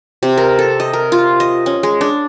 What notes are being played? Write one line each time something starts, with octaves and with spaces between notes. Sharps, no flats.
C3
A#4
A4
D#5
A#4
F4
D#5
C#4
G#3
D4